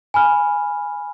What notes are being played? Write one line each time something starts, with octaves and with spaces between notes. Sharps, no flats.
G#5 B5 F6